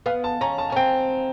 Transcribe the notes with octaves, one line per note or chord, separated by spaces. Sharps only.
B3 F5
A5
C#4 A#5
A5
C#4 G#5
C4 G5